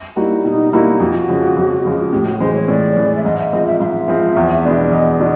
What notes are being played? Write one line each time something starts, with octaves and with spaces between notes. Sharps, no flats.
G3 A#3 D#4 E4 F#4
B2 D#4 E4
G3 A#3 D#4 E4 F#4
F2 F#4
C#3 F3 G#3
F2
C#3 F3 G#3
A2 G4
F#4
E3 G#3 C5
C#5
A2 D5
E3 G#3
E5
G#2 D#5
E5
F3 G#3 C4 D#5
E5
G#2 E5 F5
F3 G#3 C4
E2
B2 G#3 B3 D4
E2 D#5
B2 G#3 D4